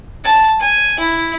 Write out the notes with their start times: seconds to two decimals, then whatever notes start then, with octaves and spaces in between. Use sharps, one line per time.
0.25 A5
0.60 G#5
0.99 E4